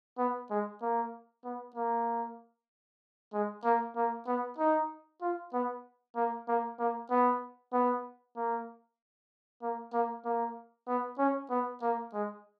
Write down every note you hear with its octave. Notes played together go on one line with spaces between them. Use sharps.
B3
G#3
A#3
B3
A#3
G#3
A#3
A#3
B3
D#4
F4
B3
A#3
A#3
A#3
B3
B3
A#3
A#3
A#3
A#3
B3
C#4
B3
A#3
G#3